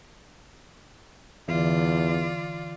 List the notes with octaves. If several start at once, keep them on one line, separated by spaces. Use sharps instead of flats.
E2 D3 E3 F4 D5